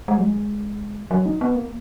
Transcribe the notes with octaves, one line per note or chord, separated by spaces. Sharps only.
G#3
F#3
G#3
F#3
D#4
B3
A#3